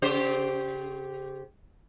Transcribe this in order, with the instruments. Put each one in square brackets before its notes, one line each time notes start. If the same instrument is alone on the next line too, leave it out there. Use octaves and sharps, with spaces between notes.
[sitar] C#3 G4 C5